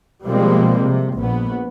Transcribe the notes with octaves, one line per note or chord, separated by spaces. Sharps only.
B2 F3 G3 G#3 A#3 C4
C3
A#1 B3